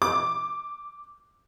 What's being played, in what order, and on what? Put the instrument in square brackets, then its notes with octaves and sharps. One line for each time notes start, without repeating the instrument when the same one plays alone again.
[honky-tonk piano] D6